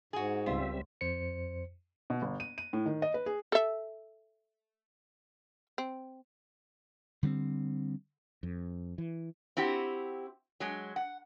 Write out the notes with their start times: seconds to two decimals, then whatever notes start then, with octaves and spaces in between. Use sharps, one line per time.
0.13 G#2 F#4 G#4
0.46 C#2 G3 C4 F4 E5
1.01 F2 C5 C#7
2.10 B2
2.22 G1
2.40 D#7
2.58 D#7
2.73 A2
2.86 D#3
3.02 D#5
3.14 B4
3.26 G#4
3.52 A4 E5
5.78 C4
7.23 D3 G3 G#3 C4
8.43 F2
8.98 E3
9.57 C4 E4 F#4 G4
10.60 F#3 G#3
10.96 F#5